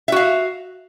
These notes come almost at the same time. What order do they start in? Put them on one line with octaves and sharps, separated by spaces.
E5 F#4 F5